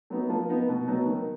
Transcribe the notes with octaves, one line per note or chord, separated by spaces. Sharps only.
F#3 B3 D#4
F3
B3 D#4
B2
F#3 B3 D#4
D#3